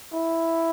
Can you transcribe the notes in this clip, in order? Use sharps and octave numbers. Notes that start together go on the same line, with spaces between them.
E4